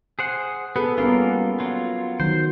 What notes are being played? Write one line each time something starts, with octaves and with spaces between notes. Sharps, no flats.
G#4 C5 F#5
B3 G#4 A4 B4
G3 A#3 B3 C#4 F4 A#4
F#3 F4
D#3 F#3 C5